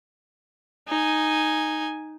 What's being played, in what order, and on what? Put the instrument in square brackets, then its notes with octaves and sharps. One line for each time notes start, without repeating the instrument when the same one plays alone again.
[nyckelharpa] D#4 G#5